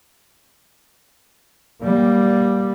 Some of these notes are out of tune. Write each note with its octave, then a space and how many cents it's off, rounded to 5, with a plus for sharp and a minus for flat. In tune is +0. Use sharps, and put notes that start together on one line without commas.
G3 -5 A#3 +20